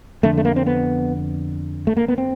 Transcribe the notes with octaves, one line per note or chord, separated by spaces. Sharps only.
F2 D3 A3
A3
A#3
C4
B3
A3
A#3
B3
C4